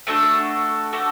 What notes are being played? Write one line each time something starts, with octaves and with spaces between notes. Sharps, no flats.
A3 D4 F#4 A4 F#5
A3 D4 F#4 A4